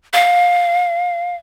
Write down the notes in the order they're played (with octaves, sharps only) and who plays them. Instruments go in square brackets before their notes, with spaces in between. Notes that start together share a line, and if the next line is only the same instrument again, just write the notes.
[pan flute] F5